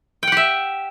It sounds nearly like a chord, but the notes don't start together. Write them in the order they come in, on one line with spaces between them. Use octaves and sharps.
G5 F#5 G4 E5